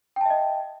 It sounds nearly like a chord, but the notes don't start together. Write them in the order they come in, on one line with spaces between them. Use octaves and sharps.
G5 A5 E5 D#5